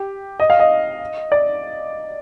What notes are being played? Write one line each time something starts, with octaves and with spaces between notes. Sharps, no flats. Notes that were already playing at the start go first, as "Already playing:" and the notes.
Already playing: G4
D#5
F5
D#5
D5